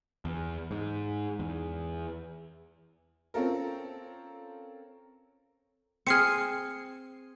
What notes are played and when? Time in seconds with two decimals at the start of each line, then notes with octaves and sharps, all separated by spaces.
0.25 E2
0.71 G#2
1.39 E2
3.34 C4 C#4 F4 A4 A#4
6.07 C4 G#4 F6 C7 C#7